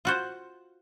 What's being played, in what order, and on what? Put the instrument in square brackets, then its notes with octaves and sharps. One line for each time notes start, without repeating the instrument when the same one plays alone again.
[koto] F4 F#4 C5